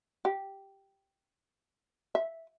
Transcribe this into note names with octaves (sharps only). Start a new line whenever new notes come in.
G4
E5